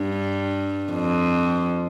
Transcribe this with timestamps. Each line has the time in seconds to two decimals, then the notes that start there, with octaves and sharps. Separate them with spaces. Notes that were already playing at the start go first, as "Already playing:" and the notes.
Already playing: G2
0.91 F2